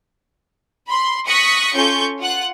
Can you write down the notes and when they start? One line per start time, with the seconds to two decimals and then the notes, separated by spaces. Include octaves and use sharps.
0.86 B5 C6
1.26 C#6 D#6 F#6 A#6 B6 C#7
1.73 C#4 F4 A4 C#6 G6
2.19 F4 F#5 F#6